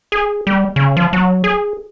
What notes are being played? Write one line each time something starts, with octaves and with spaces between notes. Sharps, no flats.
G#4
G3
C#3
F3
F#3
G#4